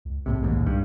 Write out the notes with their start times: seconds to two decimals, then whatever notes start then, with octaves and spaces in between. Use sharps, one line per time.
0.05 C#2
0.26 D1 B1 A2 C3
0.43 D#1 D#2 G#2
0.67 C2 G2